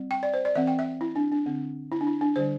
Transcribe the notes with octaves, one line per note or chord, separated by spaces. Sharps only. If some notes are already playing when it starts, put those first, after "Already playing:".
Already playing: G3 C4
G5
D5
C5
D5
E3 C4 E5
G5
E5
E4
D4
D4
D3 C4
E4
D4
E4
D4
D3 G3 D4 C5